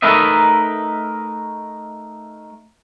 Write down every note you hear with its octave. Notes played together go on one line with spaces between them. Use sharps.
A3 D#4 A#4 B4 D#5 E5